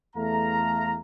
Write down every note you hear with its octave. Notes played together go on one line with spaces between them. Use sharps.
E2 A3 F5 A#5